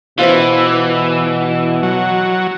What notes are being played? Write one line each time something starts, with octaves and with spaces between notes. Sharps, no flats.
B2 E3 F4 C5 E5
F#3